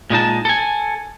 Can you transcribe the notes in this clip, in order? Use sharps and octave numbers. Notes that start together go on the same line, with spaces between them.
A#2 G#3 D#4 A5
A4 G#5